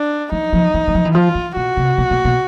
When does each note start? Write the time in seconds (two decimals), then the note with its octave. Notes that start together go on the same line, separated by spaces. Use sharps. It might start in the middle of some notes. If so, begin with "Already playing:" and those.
Already playing: D4
0.32 F3 D#4
0.53 F3
0.74 E3
0.88 E3
0.95 F3
1.05 E3
1.15 F3 F4
1.35 E3
1.56 B2 F#4
1.77 C3
1.98 B2
2.11 B2
2.25 B2